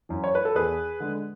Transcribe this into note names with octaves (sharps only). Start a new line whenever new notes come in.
F#2 E3
C#5
B4
A4
E2 G#4 B4
D3 G#3